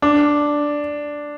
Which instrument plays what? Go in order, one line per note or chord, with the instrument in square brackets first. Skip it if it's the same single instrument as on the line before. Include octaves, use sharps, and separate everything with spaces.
[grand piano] D4